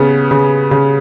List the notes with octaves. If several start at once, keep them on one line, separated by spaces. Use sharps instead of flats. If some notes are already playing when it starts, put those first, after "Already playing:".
Already playing: C#3 B3
C#3
C#3